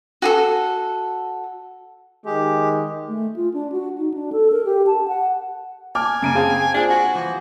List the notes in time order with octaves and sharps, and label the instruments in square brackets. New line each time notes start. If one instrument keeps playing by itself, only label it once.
[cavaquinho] F#4 G#4 A4
[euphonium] D#3 [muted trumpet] G#3 [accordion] G4
[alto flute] A3
F4
D4
F#4
D#4
D4
A4
A#4
G4
A5
F#5
[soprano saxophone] G#5 [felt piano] A5 D6 F6
[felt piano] F#2 D7 D#7 [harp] C#3 A#3
[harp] C4 G5 [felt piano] G#4 F5 A5
[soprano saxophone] D4 [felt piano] F4 G#4 C5 [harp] G#5 F6
[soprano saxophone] F#4
[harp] E3 F3